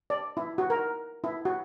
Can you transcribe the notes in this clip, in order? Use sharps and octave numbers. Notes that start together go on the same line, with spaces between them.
D5
E4
F#4
A#4
E4
F#4